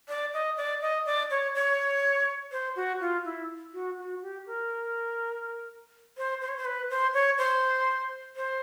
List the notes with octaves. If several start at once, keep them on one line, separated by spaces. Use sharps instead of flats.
D5
D#5
D5
D#5
D5
C#5
C#5
C5
F#4
F4
E4
F#4
F#4
G4
A#4
C5
C5
C#5
C5
B4
C5
C#5
C5
C5